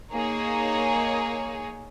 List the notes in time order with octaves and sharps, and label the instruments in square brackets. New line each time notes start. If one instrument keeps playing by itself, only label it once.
[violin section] A#3 D#4 G#4 C#5